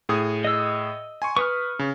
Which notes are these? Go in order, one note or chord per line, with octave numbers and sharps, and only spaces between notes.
A2 G#4 D#6
D#5 E6
G#5 C6 C#6
B4 C#6 D#6 F6
C#3